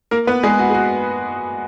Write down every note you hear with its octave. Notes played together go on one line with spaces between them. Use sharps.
A#3 A#4
B3 B4
G#3 G#4
F#4
G#4
F#4